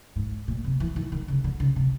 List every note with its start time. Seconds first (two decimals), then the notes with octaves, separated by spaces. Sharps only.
0.16 G#2
0.48 A#2
0.64 C3
0.80 E3
0.96 D#3
1.12 D#3
1.28 C#3
1.44 D3
1.60 C#3
1.76 C3